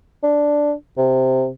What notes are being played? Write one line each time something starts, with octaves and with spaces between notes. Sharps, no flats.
D4
C3